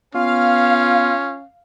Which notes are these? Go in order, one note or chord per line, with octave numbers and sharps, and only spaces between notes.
B3 C#4 F4 F5